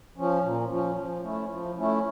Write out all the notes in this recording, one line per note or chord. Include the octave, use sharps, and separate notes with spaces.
F3 C#4
A#2
F3 C#4
F3
A3 C#4 E4
F3
A3 C#4 E4